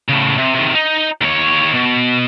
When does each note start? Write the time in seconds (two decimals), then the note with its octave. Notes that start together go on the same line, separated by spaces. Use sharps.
0.08 A2 C#3
0.38 C3
0.55 C3 D#3
0.75 D#4
1.21 D#2 C#5
1.74 B2